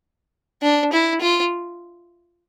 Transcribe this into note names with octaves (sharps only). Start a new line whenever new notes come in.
D4
E4
F4